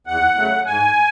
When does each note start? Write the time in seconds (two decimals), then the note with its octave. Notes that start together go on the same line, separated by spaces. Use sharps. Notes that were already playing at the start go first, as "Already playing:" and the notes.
0.07 E2 F#5
0.37 C#3 F#3 A3
0.66 G#2 G#5